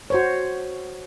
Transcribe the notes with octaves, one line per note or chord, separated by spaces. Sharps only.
F#4 C5 C#5